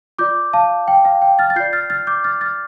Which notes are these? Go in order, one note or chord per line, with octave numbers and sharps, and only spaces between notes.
F4 D5 D6 G6
F5 A5
G5
F5
G5
F6 A6
A6
F4 D5 G6 C7
F6 A6
F6 A6
D6 G6
F6 A6
F6 A6